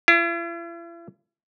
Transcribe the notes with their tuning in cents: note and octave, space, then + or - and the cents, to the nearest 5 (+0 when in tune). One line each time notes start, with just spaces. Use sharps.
E4 +45